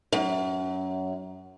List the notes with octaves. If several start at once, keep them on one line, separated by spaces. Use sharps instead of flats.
F#2